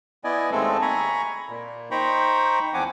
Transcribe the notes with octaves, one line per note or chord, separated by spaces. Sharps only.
B3 E4 D5 D#5 G#5
D#2 G#3 A3 C4 A4
G#5 A#5 B5 C#6
A#2
D#4 C5 G5 A#5 B5 C#6
E2 F3 C4 F#5 G#5 D6